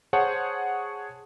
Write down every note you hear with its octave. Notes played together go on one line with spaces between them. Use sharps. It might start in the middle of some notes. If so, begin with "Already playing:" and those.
G#4 C5 C#5 F#5 A5